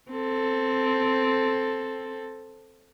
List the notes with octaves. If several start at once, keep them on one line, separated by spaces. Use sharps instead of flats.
C4 A4